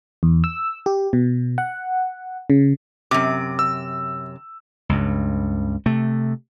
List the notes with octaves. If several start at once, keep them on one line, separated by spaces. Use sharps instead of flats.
E2
E6
G4
B2
F#5
C#3
F#2 C3 D6
E6
C#2 G2
C3 A3